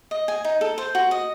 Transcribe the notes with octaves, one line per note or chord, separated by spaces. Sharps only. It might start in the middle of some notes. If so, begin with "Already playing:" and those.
D#5
G#5
D#4
A4
C5
F#4
D#5